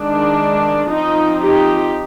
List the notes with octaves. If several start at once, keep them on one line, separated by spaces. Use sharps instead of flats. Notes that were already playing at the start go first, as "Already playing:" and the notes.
Already playing: D#3 G#3 D4
F3 C4 D#4
D#4 G4